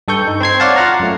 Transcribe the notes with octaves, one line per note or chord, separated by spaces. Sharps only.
G2 A4 C#6 G6
D#4
C4 C5 G#6 C7
C#5 D5 F5 F#5 A5
F4 F5 F#5 A#5
F#2 A3